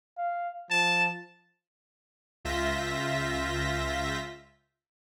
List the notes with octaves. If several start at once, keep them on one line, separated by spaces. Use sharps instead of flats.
F5
F3 A5
C#2 F4 E5 G6 A#6 B6